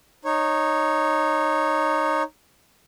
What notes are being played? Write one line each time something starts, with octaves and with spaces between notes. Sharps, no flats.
D#4 C#5